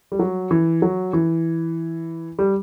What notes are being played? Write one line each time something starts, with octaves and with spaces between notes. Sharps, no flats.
G3
F#3
E3
F#3
E3
G3